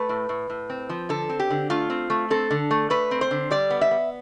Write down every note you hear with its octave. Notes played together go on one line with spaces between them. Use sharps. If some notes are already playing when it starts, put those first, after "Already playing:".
Already playing: A3 B4
A2
A2
A2
C4
F3
D3 A4
C4
G4
D3
A3 F4
C4
A3
C4 A4
D3
A3
A3 B4
C4
C5
D3
G3 D5
B3
E5
B3